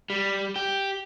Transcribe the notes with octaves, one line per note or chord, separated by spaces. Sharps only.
G3
G4